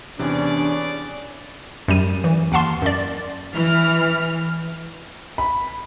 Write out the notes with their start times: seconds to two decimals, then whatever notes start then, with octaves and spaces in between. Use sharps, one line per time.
0.19 E2 C3 C#4 D4 G#4 B4 D5
1.88 F#2 G3 D#7
2.24 E3
2.52 D#2 F5 F#5 A5 C6
2.82 F#2 D5
3.54 E3 F6
5.38 B5